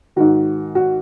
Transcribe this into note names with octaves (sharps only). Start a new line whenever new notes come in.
G#2 D#3 F#4
F#4